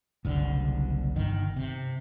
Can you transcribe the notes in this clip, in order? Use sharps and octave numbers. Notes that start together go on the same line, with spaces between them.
F#1 C2 D3
G1 D#3
C3